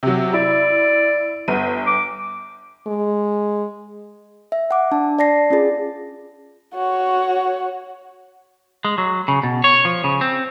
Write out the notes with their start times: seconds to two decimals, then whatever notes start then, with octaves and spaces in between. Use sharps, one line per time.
0.03 C3 F#3
0.34 E4 D5
1.48 G1 B3 D#7
1.87 D6
2.87 G#3
4.52 E5
4.71 F#5 D6
4.92 D4 A5
5.19 D5 A5 A#6 C7
5.50 C#4 F4 G#4
6.75 F#4 C#5
8.85 G#3
8.98 F#3
9.28 C#3
9.43 B2
9.64 C#5
9.85 F3
10.04 C#3
10.21 C4